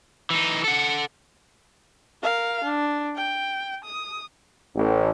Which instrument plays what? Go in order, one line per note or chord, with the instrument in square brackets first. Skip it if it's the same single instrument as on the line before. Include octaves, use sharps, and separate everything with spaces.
[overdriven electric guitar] E3 D#4
A4 F#5
[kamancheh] A#4 F5
D4
G5
D#6
[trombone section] A1